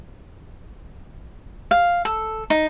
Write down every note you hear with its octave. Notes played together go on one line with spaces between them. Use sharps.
F5
A4
D#4